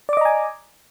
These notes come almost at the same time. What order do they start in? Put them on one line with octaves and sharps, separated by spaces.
D5 D6 D#5 A#5 G#5